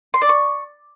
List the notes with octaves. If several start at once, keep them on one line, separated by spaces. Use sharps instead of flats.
C6
D5
C#6